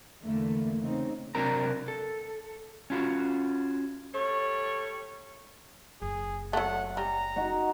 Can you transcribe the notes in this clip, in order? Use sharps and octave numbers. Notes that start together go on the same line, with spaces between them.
E2 D3 A3 A#3
C#3 C4 D#4
C3 F#3 C4 D4 A#4 A#5
A4
C#4 F4 F#4
G3 A3 C#5
F#1 G#4
F#3 A3 F#5
G3 A#5
D#4 F#4